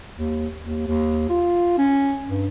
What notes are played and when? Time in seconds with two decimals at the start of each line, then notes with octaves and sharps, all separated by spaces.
0.18 D#2
0.64 D#2
0.88 D#2
1.29 F4
1.78 C#4
2.29 G2